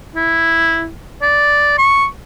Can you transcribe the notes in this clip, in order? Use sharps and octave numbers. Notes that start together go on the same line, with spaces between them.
E4
D5
C#6